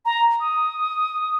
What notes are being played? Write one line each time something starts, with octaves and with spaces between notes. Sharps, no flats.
A#5
D#6